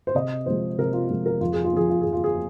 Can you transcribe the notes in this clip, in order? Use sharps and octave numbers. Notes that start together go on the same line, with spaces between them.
C5
C3 D#5
F3 G#3 C5
C3 A#4
F4
F3 G#3
A#4
F2 F4
G#4
F4
F3 C4 G#4
F4
F2 G#4
F4
G#4